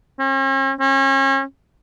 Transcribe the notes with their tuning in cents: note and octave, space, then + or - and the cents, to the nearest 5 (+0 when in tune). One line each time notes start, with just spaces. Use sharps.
C#4 -45
C#4 -35